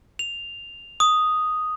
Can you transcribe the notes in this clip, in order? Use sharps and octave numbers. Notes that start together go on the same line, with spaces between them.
F7
D#6